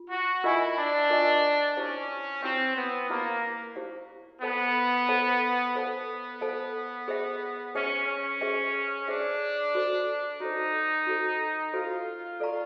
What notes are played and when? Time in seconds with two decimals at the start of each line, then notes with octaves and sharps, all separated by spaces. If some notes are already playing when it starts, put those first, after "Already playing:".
Already playing: F4
0.10 F#4
0.44 E4 F4 A#4 D#5 G#5 C#6
0.77 D4
1.10 F4 A#4 D#5 G#5 C#6
1.76 C#4 E4 G4 C5 F5
2.42 C4 E4 G4 C5 F5
2.75 B3
3.09 A#3 E4 G4 C5 F5
3.76 E4 G4 C5 F5
4.42 B3 A4 C5 F5 A5
5.08 A4 C5 F5 A5
5.75 B3 A4 C5 F5 A5
6.41 A4 C5 F5 A5
7.08 G#4 C5 E5 G5
7.74 C#4 G#4 C5 E5 G5
8.07 C#4
8.41 G#4 C5 E5 G5
9.07 D4 G#4 C5 E5 G5
9.75 F#4 A4 C5
10.40 D#4 F#4 A4 C5
11.07 F#4 A4 C5
11.73 F4 F#4 A4 C5
12.40 A4 D5 F5 A#5 C#6